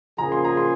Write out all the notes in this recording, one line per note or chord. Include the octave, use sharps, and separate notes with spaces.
C#3 F3 A#3 F4 G#4 A#5
C6
A#5
C6